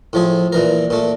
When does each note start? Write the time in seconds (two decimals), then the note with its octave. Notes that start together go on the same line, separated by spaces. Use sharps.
0.13 A2 F3 G#4
0.52 A#2 E3 A#4
0.90 A#2 A3